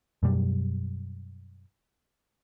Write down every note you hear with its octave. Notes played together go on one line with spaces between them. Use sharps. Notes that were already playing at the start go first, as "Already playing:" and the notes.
F#2 B2 G3